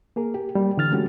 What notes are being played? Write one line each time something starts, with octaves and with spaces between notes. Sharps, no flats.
A#3 G#4 A#4
G4
G3 A#3
D3 E3 F6 A6
F#3 G#3 A3 C#4 F#4 G4